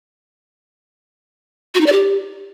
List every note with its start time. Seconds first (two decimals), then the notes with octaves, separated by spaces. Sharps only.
1.75 F#4
1.80 D#4
1.86 D5
1.92 G4